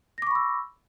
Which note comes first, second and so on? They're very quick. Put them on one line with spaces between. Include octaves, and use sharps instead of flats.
A#6 D6 C#6 B5 E6